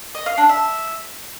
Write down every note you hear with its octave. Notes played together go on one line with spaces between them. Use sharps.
D#5
F5
D4
E5